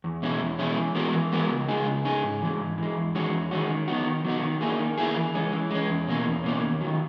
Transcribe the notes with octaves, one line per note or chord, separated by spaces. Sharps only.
E2
B2 G#3 C#4 E4
E2
B2 G#3 C#4 E4
E3
G#3 B3 F#4 A#4
E3
G#3 B3 F#4 A#4
C#2
C#3 G#3 D#4 G#4
C#2
C#3 G#3 D#4 G#4
G#2
E3 G#3
G#2
E3 G#3
E2
D#3 G#3 C#4 F#4
E2
D#3 G#3 C#4 F#4
D#3
F#3 B3 D#4 F#4
D#3
F#3 B3 D#4 F#4
D#3
A#3 E4 G#4
D#3
A#3 E4 G#4
E3
G#3 C#4
E3
G#3 C#4
E2
B2 A#3 C#4
E2
B2 A#3 C#4
D#2
D#3 F#3